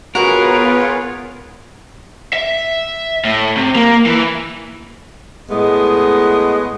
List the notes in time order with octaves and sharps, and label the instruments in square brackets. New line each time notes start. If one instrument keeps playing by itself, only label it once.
[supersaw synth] B3 F4 [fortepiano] F#4 [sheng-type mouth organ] G#4 B4 C#5 [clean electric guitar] A#4
[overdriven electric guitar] E5
A2
C3
A#3
E3
[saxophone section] A2 G#3 A3 B3 D#5